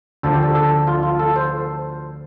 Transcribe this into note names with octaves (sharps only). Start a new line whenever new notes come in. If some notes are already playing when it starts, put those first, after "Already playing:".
D2 D3 F3 A4
G4
A4
A4
F4
F4
A4
C5